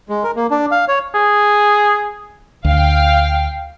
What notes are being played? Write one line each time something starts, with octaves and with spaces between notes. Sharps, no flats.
G#3
A#4
A#3
D4
F5
C#5
G#4
D2 F5 G5